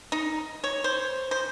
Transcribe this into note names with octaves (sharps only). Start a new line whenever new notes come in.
D#4
C#5
C5
C5